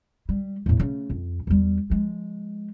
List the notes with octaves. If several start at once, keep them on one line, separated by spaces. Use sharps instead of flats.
G3
E2 A2
C#3 A3
F2
E2 G3
F3 G#3